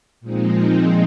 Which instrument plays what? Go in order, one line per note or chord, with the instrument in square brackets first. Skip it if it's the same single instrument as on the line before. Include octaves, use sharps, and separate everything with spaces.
[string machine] A#2 F3 G#3 C4 D#4